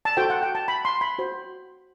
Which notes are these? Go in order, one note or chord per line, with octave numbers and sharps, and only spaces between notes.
A5
F#4 A4 C5 G5
F#5
G5
A5
B5
C6
B5
F#4 C5